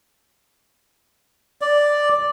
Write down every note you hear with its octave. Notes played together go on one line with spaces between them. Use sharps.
D5